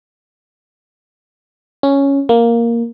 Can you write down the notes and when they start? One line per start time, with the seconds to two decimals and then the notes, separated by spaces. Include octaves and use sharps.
1.83 C#4
2.29 A#3